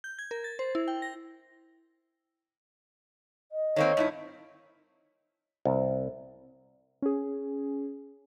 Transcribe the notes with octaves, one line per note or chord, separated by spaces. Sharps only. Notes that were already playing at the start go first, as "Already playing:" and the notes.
G6
G#6
A#4
A6
C5
E4
G5
A#6
D#5
D#3 A#3 C4 C#5
G2 D#4 E4
C2
C#4 G#4